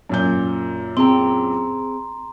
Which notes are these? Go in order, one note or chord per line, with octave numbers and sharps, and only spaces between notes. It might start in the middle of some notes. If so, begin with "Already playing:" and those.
F#2 A#2 G6
C4 G#4 G5 A#5 C6